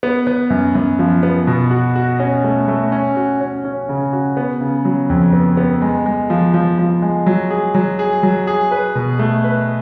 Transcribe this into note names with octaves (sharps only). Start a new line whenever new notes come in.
B3
B3
F#2
F#2
F3
B3
B2
F#4
F#4
C#4
A3
A3
C#4
F#4
C#4
C#4
C#3
F#4
B3
C#3
F#3
F2
B3
B3
G#3
G#3
F3
F3
F3
G#3
F#3
G#4
F#3
G#4
F#3
G#4
B4
B2
A3
B4